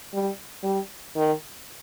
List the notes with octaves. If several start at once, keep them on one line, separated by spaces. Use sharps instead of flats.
G3
G3
D#3